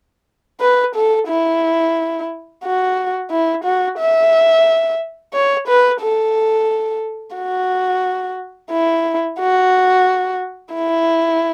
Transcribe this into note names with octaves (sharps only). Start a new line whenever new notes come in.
B4
A4
E4
F#4
E4
F#4
E5
C#5
B4
A4
F#4
E4
F#4
E4